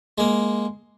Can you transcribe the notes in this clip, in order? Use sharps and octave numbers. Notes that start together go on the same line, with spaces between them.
G#3 A#3